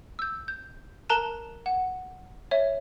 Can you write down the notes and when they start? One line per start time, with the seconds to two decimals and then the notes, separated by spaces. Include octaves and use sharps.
0.19 E6 G6
0.48 G6
1.10 A#4 A5 A#5 F#6 E7
1.66 F#5
2.51 C#5 E5